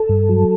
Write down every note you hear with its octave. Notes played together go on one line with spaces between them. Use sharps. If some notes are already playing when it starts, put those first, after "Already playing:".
Already playing: A4
G2
F#3